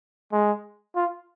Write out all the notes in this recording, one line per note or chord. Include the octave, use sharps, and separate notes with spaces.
G#3
F4